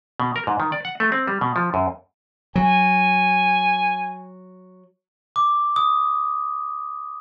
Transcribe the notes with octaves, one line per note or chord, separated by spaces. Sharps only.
B2
A#4
G#2
D#3
D5
F#5
A3
C4
G3
B2
F3
F#2
F#3 G#5
D6
D#6